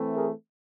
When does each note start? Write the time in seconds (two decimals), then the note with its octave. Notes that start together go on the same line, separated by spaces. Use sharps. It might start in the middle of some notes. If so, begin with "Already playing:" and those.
Already playing: E3 A3 C4
0.15 G#4 A#4